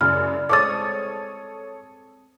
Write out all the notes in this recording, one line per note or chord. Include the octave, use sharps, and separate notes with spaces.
F#2 C#3 G3 E4 F6
G#3 C4 A4 C#5 D6 D#6 A6